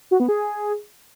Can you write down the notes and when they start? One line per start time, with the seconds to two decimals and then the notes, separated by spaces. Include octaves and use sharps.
0.11 F#4
0.20 B3
0.29 G#4